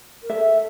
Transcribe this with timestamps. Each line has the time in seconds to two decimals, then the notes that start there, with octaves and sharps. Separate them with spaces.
0.23 A#4
0.30 A4 E5